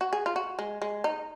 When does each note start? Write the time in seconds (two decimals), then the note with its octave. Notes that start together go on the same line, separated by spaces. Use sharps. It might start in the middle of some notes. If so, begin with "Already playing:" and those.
0.01 F#4
0.13 G#4
0.26 F4
0.36 F#4
0.59 G#3
0.82 G#3
1.04 D#4